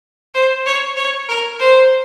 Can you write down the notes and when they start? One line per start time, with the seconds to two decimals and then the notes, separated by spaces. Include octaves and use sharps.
0.34 C5
0.66 C#5
0.97 C#5
1.29 A#4
1.59 C5